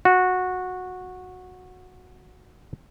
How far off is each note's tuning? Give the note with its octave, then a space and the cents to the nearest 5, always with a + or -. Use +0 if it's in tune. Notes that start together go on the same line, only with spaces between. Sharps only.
F#4 -15